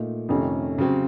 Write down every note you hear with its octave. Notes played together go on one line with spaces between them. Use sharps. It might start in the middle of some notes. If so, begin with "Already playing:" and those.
Already playing: A#2 A3 D#4
F2 C3 D#3 A3 C#4
C#3 F#3 C4